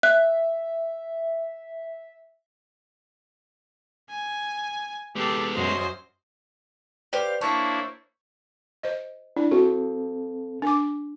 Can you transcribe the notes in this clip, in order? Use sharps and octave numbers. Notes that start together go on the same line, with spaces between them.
E5 F#6
G#5
G#3 B3 G4 A4
F#2 F#4 C5 D#5
G4 B4 C5 D5 F5
A#3 D4 E4 C5 C#5 A5
C5 D#5
D4 E4
C4 F#4 A4
D4 D6